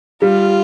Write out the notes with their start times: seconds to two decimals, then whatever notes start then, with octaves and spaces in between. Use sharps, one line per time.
0.22 G3 F4